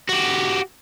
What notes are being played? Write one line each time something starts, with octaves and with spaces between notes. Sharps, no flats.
F#4 G4